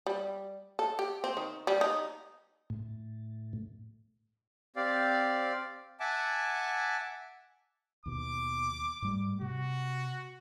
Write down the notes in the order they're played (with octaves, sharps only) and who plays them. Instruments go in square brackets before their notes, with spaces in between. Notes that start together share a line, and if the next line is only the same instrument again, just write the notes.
[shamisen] G3
A4
G4
C4
D#3
G3
D#4
[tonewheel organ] A2
[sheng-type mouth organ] C4 G4 D5 F5
E5 F#5 G#5 A5 D6
[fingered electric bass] D#2 B2 [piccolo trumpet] D6
[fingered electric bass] G#2 G3 A3
[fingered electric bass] C3 [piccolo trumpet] F#4